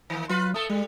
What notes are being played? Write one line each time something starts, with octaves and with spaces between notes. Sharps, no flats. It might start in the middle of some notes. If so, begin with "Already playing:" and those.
D#3 A#3
F#3 F4 B4
A3 A4 D#6
G3 G#3